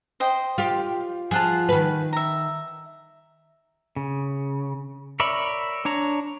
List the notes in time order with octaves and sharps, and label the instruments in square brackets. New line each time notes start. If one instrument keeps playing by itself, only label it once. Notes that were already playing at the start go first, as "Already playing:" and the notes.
[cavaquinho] C5 D#5 G5
[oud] F4 G4
[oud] F3 [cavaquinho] G#4 F#5 A5
[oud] D#3 B4
[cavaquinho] E5 A#5
[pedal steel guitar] C#3
A#4 C#5 D5 E5 B5
D4 C#5 A#5